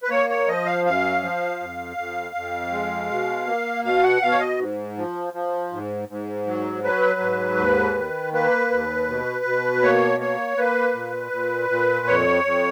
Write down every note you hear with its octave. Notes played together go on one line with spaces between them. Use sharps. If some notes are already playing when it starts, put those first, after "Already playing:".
B4
A#3 C#5
C#5
F3 D#5
F5
F#2 F5
F3
F2
F2
F2
G#3
B2
A#3
B2 F5
F#5
B2 F5
C#5
D#5
G#2
F3
F3
G#2
G#2
F#3
F#3 B4
G#2
D#2
D#3
A#3 B4
D#2
B2
B2
A#3 C#5
A#3 C#5
A#3 B4
A#2
A#2
A#2
F2 C#5
F2